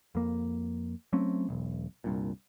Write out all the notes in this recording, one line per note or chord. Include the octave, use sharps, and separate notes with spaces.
F2 A#3
F#3 A3 C4 C#4
E1 B1
C2 G2 A#2